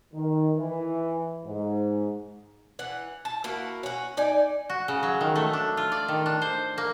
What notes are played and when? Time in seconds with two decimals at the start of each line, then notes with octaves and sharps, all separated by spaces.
0.13 D#3
0.57 E3
1.46 G#2
2.79 E3 F#5
3.25 A5
3.44 A#3 E4 F#4
3.83 C#4 F#4
4.17 D#4 D5 G#5
4.69 F#4
4.88 C#3
5.03 F#3
5.21 D#3
5.36 A3
5.53 D4
5.77 F4
5.92 D5
6.08 D#3
6.26 D4
6.42 C5
6.78 A#3